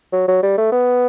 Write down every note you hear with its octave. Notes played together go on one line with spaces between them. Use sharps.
F#3
F#3
G3
A3
B3